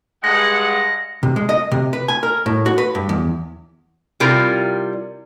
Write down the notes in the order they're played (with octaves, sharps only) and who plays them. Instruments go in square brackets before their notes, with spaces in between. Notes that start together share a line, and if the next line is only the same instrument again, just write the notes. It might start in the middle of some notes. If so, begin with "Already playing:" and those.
[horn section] G2 G#3 F#5 [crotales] A#6
[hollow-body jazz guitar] C3
G#3
D#5
C3
B4
G#5
A#4
A2
F#4
B4
G2
E2
[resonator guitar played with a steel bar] C3 G3 E4 F4 A#4